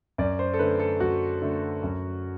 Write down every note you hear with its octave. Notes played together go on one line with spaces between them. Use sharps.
F#2 D5
C5
A4
D3 A3 B4
A4
F#2 F#4
D3 A3
F#2